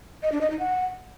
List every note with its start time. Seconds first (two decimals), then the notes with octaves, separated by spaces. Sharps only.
0.23 D#5
0.32 D4
0.41 D#5
0.50 D#4
0.59 F#5